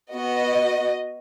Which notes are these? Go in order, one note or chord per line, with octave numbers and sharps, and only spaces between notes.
B3 F#4 D#5